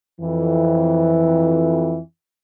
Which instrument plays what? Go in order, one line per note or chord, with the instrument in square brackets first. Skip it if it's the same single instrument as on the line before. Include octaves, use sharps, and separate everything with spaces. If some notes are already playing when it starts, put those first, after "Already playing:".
[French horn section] F2 E3